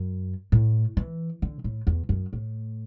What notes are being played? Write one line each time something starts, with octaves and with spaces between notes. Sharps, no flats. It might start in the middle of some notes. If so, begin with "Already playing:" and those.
Already playing: F#2
A2
E3
D3
A2
E2
F#2
A2